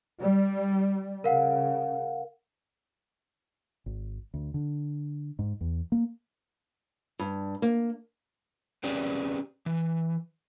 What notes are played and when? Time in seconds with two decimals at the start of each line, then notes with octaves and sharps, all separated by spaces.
0.20 G3
1.24 C#3 A#4 F5 F#5
3.86 G#1
4.34 D2
4.54 D3
5.39 G#2
5.61 E2
5.92 A#3
7.19 G2
7.62 A#3
8.84 C4 C#4 G4 G#4 B4 D5
9.66 E3